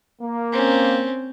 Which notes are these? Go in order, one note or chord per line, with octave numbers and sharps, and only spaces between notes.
A#3
C4 C#4